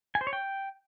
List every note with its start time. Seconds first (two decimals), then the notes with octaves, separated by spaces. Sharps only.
0.15 G#5
0.21 C5
0.27 C#5
0.33 G5